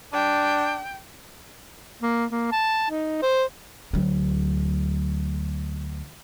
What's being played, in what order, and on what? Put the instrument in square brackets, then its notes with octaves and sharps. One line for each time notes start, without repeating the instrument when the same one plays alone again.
[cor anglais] D4 [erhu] G5
[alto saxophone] A#3
A#3
A5
D#4
C5
[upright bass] D2 F#3